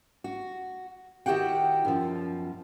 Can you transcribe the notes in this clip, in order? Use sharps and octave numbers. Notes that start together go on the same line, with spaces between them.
F#4
D#3 E4 F#4 G4 F#5 G5
F#2 B2 F3